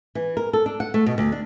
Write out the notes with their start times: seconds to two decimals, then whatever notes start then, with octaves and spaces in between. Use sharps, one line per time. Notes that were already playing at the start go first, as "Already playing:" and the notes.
0.15 E3
0.37 A#4
0.53 A4
0.66 D4
0.80 F#5
0.94 A3
1.06 B2
1.18 D2
1.32 D4